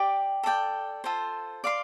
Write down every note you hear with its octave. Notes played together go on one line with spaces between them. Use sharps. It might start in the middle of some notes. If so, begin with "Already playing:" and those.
Already playing: G4 D5 G5 D6
A4 D5 G5
F4 A4 C5
D5 F5 C6